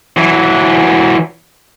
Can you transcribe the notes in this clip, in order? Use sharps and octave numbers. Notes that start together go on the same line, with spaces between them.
E3 F#3